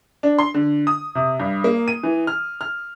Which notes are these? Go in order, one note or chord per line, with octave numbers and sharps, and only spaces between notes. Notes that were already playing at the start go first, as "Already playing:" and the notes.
D4
C6
D3
D#6
C3
G2
A#3
D#7
E3
F6
F6